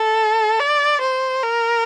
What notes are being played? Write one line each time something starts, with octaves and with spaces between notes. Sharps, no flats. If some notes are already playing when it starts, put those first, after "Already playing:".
Already playing: A4
D5
C5
A#4